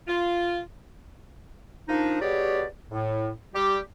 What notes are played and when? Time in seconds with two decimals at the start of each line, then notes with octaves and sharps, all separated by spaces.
0.08 F4
1.88 F3 A#3 D4 D#4
2.21 B2 G3 G4 G#4 C#5 D5
2.91 A2
3.54 G3 G4